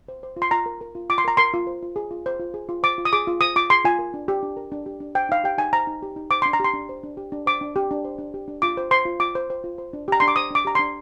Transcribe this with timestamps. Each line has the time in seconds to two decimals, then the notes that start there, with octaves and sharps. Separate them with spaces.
0.08 C5
0.23 C5
0.37 F4
0.42 C6
0.51 F4 A#5
0.66 A#4
0.81 A#4
0.95 F4
1.09 F4 D6
1.18 C6
1.25 A#4 A#5
1.37 A#4 C6
1.54 F4
1.67 C5
1.83 F4
1.96 G#4
2.11 F4
2.26 C5
2.40 F4
2.54 G#4
2.69 F4
2.83 C5 D6
2.98 F4
3.05 D#6
3.13 G#4 D6
3.27 F4
3.41 C5 D#6
3.56 F4 D6
3.70 G#4 C6
3.85 F4 G#5
3.99 A#4
4.14 D4
4.28 G4
4.43 D4
4.57 A#4
4.72 D4
4.86 G4
5.00 D4
5.15 C5 G5
5.29 D#4 F5
5.44 G4 G5
5.58 D#4 G#5
5.73 C5 A#5
5.87 D#4
6.02 G4
6.16 D#4
6.31 C5 D6
6.42 D4 C6
6.53 A#5
6.60 G4 C6
6.74 D4
6.89 C5
7.03 D4
7.17 G4
7.32 D4
7.46 C5 D6
7.61 D4
7.76 G4
7.91 D4
8.05 C5
8.18 D4
8.34 G4
8.48 D4
8.62 F4 D6
8.77 C5
8.91 C5 C6
9.05 F4
9.20 F4 D6
9.35 C5
9.50 C5
9.64 F4
9.78 C5
9.93 D4
10.08 G4 A#5
10.20 D4 C6
10.28 D6
10.36 C5 D#6
10.50 D4 D6
10.65 G4 A#5
10.75 D4 C6